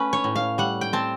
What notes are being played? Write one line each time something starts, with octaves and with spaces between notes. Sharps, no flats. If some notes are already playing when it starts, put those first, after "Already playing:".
Already playing: A3 C#4 B4
C#5
A2
F5
G3 F#5
G5
C4 A5